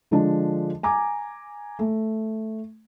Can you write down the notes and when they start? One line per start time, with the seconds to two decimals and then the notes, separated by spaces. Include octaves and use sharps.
0.11 D3 F3 G#3 D4
0.83 G#5 A#5 D6
1.79 A3